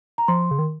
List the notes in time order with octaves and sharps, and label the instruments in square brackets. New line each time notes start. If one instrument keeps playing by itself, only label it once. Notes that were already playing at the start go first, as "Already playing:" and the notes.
[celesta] A#5
[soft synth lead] F3 [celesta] C6
[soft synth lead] C#3
D#3